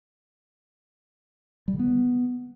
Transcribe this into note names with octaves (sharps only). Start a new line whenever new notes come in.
G3
D3
B3